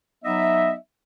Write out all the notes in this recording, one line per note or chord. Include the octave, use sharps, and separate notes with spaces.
F#3 B3 D#4 D#5 E5